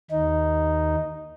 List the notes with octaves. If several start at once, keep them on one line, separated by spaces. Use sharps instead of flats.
D#2 D#4